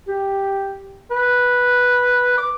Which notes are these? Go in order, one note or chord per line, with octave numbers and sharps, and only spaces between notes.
G4
B4
D6